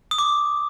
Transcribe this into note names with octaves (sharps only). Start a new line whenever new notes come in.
D#6
D6